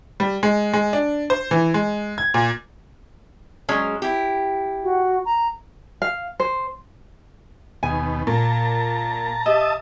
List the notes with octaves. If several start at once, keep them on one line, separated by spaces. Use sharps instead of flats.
G3
G#3
G#3
D4
C5
E3
G#3
G#6
A#2
F#3 G#3 C#4
E4 G4
F#4
A#5
F5
C5
D#2 B2 G#5
A#2 A5 A#5
G4 D#5 E5 A5 D#6